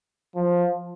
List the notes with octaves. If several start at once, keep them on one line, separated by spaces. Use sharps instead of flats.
F3